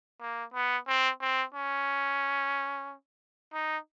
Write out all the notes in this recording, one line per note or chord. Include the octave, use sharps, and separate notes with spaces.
A#3
B3
C4
C4
C#4
D#4